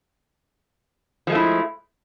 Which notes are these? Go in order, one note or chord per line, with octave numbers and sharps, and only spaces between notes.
F3 G#3 A3 E4